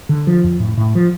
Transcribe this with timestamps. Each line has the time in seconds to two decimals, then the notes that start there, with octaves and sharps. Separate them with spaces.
0.09 D3
0.27 F3
0.44 F2
0.60 A2
0.77 A2
0.95 F3